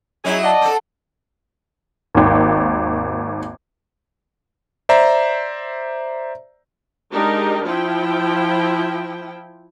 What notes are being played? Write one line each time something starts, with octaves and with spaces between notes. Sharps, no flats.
F#3 C#4 D#4 E4 G#4
D5 D#5 F#5 A5
C4 A4
G#1 D#2
C5 D5 E5 A#5
G#3 D4 D#4 G4 A#4
F3 E4 F4 G5